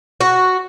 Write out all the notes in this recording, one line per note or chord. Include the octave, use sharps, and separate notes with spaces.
F#4